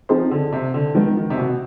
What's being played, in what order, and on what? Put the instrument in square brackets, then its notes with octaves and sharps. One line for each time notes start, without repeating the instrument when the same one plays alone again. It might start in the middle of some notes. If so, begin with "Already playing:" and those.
[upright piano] F3 [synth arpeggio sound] C4 D#4 G#4 C5
[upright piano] D3
C3
D3
[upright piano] D#3 [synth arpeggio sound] F3 G#3 B3
[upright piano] D#3
C3
B2